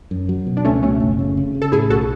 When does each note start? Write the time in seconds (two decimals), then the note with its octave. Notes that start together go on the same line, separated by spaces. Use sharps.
0.11 F#2
0.29 F#3
0.47 B2
0.57 D4
0.65 C#2 A3 C#4
0.82 B2 A3 C#4
1.00 F#1
1.19 C#3
1.37 C#3
1.55 C#3
1.62 A4
1.72 A2 E4 G#4
1.90 B1 F#4 A4